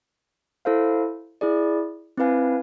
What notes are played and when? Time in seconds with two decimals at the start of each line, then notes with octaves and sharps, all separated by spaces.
0.65 E4 A4 C5 F5
1.41 E4 G#4 D5
2.17 C4 E4 B4 F5 G#5